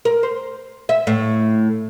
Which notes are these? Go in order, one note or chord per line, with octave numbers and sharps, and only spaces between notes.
A#4
C5
E5
A2